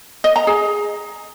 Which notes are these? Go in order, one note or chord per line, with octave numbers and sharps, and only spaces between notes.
D#5
A#5
G#4